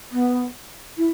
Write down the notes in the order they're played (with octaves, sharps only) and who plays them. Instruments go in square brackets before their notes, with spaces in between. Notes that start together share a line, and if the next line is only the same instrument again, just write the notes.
[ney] B3
E4